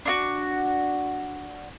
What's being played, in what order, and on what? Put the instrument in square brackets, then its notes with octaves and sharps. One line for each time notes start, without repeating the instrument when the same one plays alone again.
[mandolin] D4 F4 F#4